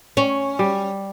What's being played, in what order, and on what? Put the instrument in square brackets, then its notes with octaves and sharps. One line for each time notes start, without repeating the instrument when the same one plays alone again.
[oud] C#4
[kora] G3